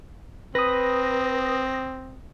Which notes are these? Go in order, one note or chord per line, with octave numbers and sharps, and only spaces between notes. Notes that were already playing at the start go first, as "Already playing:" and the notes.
C4 B4 D#6 A#6